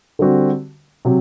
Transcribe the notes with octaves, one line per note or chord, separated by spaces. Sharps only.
D3 G3 C4 F#4
C3 F#3